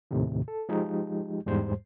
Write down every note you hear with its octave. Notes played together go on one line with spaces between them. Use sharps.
D#2 A2 C3 D#3
A4
F3 G#3 D#4 G4
E2 G#2 G3 C5